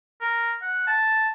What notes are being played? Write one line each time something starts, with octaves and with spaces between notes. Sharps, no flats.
A#4
F#5
A5